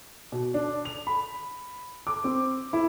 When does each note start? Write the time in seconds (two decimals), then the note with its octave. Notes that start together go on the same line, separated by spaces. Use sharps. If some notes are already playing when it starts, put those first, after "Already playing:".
0.32 B2
0.54 D4
0.85 F7
1.07 B5
2.07 D6
2.24 C4
2.73 E4